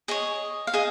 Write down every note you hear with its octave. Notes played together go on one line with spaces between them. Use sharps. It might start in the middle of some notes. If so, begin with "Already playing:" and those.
G#4 C#5 D#5
F5
G#4 D#5